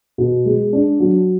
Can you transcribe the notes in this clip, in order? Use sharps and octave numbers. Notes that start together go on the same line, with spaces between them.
B2
G#3
D4
F#3